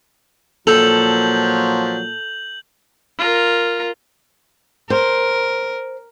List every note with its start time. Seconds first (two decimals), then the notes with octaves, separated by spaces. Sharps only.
0.67 A#2 F3 F#3 A4 G6 F7 F#7
3.19 F4 A#4
4.90 A#4 C5